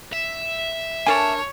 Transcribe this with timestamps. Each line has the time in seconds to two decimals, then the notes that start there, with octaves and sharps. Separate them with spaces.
0.12 E5
1.07 D4 A#4 C#5 G#5 A5